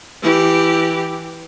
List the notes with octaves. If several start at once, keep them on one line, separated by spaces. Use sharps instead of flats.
E3 G4